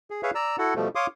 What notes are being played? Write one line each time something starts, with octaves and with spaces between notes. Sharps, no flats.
G#4
G#4 B4 C#5 E5 F5
D5 A#5 E6
E4 F#4 A4 F#5
B2 F3 G3 A3
C#5 F5 C6 D6 D#6